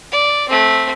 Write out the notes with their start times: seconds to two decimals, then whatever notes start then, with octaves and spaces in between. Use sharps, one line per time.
0.12 D5
0.48 A3 C4